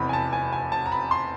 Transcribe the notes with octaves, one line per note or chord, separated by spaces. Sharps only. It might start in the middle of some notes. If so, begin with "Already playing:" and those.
Already playing: F1 E2 C3 B5
G#5
A5
G#5
G#5
A5
A#5
B5
C6